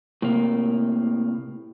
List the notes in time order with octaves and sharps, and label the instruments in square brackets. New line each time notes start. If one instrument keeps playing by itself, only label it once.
[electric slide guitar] A2 C3 A#3